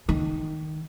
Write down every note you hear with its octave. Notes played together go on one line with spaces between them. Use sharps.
D#3